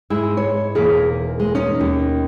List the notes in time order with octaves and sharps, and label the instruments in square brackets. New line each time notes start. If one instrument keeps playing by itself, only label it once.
[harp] G#2 E4 E6 [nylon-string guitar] G#3
[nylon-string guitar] C#5
[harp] E1 A#3 B6 [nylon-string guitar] G#4
[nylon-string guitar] G#3
[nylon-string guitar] C#4 [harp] D#4
[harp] D#2